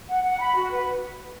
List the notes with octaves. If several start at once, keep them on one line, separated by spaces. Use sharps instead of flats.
F#5
F#5
B5
F#4
B4